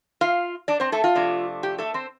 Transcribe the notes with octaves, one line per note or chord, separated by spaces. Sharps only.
F4 F5
D4 D5
C4 C5
A3 A4
F4
F2 C3 A3 D4
G4
A3 A4
C4 C5